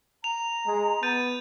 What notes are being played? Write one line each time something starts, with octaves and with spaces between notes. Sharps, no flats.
A#5 F7
G#3
B3 G6 A6 D#7